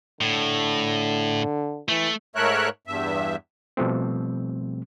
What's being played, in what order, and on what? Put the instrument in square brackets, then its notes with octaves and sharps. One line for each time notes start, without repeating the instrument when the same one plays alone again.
[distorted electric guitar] A2 [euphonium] D3
[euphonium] E3 [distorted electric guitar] A3
[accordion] G#2 A3 A#4 C#5 E5 F#6
E2 G2 E5
[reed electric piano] B2 F3 G3 A3 C4